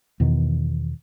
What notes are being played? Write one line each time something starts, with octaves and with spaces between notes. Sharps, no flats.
E2 B2 D#3